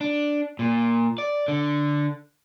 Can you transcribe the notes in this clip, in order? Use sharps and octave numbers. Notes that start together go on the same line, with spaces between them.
D4
A#2
D5
D3